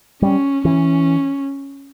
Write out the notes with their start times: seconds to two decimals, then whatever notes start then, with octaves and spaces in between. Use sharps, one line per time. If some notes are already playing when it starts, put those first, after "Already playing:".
0.22 G3 C#4
0.65 E3 C#4